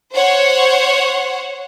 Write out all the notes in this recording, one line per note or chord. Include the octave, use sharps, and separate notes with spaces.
C5 C#5 F#5